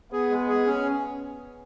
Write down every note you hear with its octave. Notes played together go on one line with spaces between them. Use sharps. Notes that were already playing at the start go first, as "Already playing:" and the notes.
B3 G#4
G#3
G#4
C#4